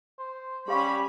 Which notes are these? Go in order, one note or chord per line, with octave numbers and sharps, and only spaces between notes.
C5
G3 C#4 G4 F5 B5 C#6